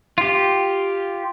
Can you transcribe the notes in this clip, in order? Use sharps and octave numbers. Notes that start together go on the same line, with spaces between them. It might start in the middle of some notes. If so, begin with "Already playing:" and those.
F4 G4